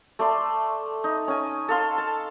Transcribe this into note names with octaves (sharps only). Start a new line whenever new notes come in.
A3 D5 C6
D#4
C#4 G#5
A4 F5 C6
A5